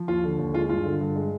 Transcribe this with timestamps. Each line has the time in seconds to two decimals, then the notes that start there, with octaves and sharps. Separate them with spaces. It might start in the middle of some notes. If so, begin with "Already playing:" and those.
Already playing: F3
0.08 D#2 F4
0.24 D3
0.38 D#2
0.53 G#3 F4
0.69 G2 F4
0.84 D3
1.01 G2
1.16 G#3